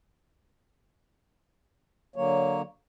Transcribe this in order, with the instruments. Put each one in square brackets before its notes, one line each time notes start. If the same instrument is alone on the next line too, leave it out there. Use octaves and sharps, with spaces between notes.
[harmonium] D3 F#3 A#3 C#5